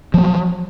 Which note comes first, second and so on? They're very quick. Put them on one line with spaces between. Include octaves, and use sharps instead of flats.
F3 A#3 F#3